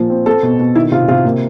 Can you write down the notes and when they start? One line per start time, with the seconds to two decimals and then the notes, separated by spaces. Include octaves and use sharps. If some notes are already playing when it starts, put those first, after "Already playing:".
Already playing: A#2 F3
0.10 C4
0.26 C4 A4
0.43 B2
0.59 B2
0.75 D#3 E4
0.92 C3 F4
1.08 C3 F4
1.25 A#3